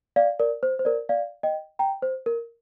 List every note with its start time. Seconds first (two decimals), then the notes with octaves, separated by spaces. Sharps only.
0.16 D5 F5
0.39 A#4 D5
0.63 C5
0.79 C5
0.85 A#4 D5
1.09 D5 F5
1.43 D#5 G5
1.79 G5 A#5
2.02 C5
2.26 A#4